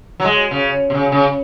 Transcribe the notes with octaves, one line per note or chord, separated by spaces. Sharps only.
F#3
G#3
C#3
C3
C#3
C#3